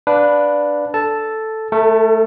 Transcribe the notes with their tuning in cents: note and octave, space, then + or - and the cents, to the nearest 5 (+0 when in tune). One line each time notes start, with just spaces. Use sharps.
D4 +0 B4 +0 F5 +20
A4 +0 A5 +0
A3 -5 A4 +40